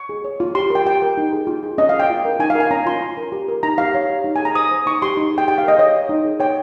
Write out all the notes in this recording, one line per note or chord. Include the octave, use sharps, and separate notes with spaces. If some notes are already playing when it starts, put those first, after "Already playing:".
Already playing: C#6
G#4
C#5
F4
G4 C6
A#4 G5
G4 G5
A#4
D#4
G#4
F4
G#4
C#4 D#5
F5
G#4
G5
F4
A#4
D#4 G#5
F5
A#4 G#5
C#4 A#5
F4 C6
F4
A#4
G4
A#4
D#4 A#5
G4 F5
C#5
G4
D#4
G#5
G#4
A#5
C5 D#6
C5
D#4 C#6
G4 C6
D#4
G#4
G5
G4 G5
F5
A#4
D#5
C#5 D#5
C#5
D#4
G#4
C#5 G5